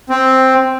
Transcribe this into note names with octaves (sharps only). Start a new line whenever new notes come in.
C4